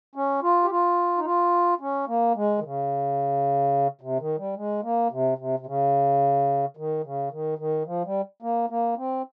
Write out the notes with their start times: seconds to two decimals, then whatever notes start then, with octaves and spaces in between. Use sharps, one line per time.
0.15 C#4
0.43 F4
0.63 G4
0.70 F4
1.17 D#4
1.25 F4
1.81 C#4
2.08 A#3
2.35 G#3
2.59 D#3
2.64 C#3
4.01 C3
4.20 D#3
4.38 G3
4.56 G#3
4.83 A#3
5.11 C3
5.38 C3
5.60 C3
5.66 C#3
6.77 D#3
7.04 C#3
7.31 D#3
7.58 D#3
7.86 F3
8.05 G3
8.42 A#3
8.70 A#3
8.97 C4